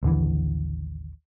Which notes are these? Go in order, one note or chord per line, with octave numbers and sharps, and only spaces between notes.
A1 D#2 D3 E3